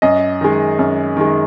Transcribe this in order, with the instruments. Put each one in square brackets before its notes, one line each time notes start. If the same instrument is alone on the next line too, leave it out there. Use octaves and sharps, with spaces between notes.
[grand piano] F#2 D#5
D#3 G#3
F#2
D#3 G#3